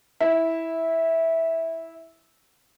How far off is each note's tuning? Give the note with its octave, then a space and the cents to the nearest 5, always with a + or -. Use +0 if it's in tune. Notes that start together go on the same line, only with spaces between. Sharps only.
E4 -10